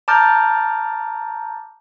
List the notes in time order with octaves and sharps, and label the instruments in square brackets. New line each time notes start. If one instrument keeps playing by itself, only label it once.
[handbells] A5 A#5 D6 F6 G6 A6